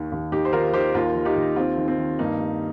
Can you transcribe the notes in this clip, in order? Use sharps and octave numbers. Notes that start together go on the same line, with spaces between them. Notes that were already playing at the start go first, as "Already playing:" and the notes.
Already playing: D#2 D#3
D#2
D#2 D#4 G4
C5
D#3 F4 A#4
D#3 G4 C5
D#2 F4 A#4
D#3
D#4 G4
D#2
D#3 C4 F4
D#3
C4
D#3
G2 A#3 D#4
G3